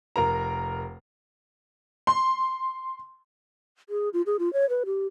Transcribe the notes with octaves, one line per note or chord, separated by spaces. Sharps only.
F1 A#4 A#5
C6
G#4
F4
G#4
F4
C#5
B4
G4